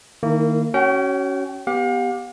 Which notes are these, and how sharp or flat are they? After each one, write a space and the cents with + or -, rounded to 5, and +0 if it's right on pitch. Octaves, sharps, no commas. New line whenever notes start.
D#3 +0 A#3 -25 E4 -25
C#4 +0 F#4 +25 G5 -30
B3 +0 G4 +0 F5 +45